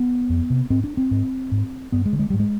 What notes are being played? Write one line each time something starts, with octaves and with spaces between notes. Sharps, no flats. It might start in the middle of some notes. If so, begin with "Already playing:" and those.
Already playing: B3
F2
C3
G#2 C4
D4
C4
G#2
G#2
G2 B3
G#3
D3
G#3
G#2 G3
G#3